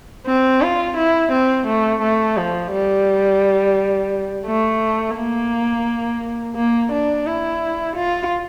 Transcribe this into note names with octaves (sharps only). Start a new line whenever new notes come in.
C4
F4
E4
C4
A3
A3
F3
G3
A3
A#3
A#3
D4
E4
F4